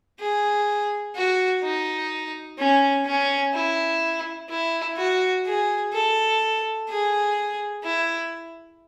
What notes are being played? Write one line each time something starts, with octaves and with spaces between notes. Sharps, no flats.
G#4
F#4
D#4
C#4
C#4
E4
E4
F#4
G#4
A4
G#4
E4